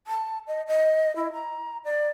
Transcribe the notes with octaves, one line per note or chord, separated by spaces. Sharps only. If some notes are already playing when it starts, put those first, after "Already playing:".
A5
D#5
D#5
E4
A#5
D5